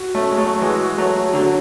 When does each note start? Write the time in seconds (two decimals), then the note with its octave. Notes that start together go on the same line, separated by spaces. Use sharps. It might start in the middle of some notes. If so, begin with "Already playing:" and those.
Already playing: F#4
0.15 A3 C#4
0.31 G#3
0.38 F#3 A3
0.61 E3 G#3
0.98 F#3 A3
1.26 G#4
1.34 D3 F#3 F#4